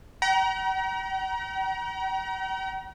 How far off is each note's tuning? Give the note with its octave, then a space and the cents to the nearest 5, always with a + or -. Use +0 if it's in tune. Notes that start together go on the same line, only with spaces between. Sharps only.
G5 -45 A#5 +35